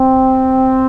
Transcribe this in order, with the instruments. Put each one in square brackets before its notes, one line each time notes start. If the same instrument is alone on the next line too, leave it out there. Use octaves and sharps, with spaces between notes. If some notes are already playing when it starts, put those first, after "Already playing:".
Already playing: [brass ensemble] C4